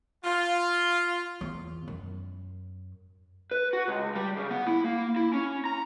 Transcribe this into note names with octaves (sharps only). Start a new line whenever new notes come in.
F4
E2
F#2
B4
F#4
C#2
G3
C#3
B3
E4
A#3
E4
C#4
A#5